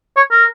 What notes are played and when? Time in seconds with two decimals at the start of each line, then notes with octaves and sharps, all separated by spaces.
0.16 C#5
0.31 A#4